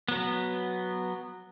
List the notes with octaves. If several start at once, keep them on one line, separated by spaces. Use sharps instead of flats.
F#3 B3